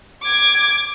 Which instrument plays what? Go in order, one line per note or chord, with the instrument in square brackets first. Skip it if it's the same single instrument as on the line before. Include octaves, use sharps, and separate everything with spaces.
[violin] D6 G#6